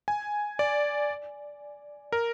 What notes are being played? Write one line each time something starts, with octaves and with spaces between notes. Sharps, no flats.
G#5
D5
A#4